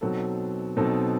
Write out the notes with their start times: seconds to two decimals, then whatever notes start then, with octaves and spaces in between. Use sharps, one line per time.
0.01 B2 F#3 C4 D#4 A4
0.77 B2 F#3 C4 D#4 A4